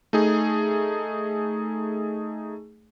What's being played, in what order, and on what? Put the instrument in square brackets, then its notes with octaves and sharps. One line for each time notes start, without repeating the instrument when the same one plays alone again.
[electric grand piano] A3 D#4 G#4